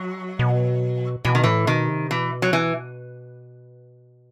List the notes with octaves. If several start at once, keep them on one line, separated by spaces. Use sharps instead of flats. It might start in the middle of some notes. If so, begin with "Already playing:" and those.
Already playing: F#3
B2
B2 E3
D#3
A2 E3
B2 D#3
C3
B2 E3
F#3
E3